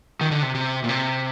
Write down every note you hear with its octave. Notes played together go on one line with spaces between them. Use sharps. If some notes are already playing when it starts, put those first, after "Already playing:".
D#3
D3
C3
C3
A#2
C3